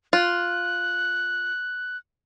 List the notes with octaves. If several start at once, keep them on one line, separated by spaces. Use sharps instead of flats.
F4 F#6